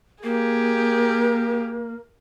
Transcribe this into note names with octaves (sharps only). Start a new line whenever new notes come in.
A#3 G4 G#4 A#4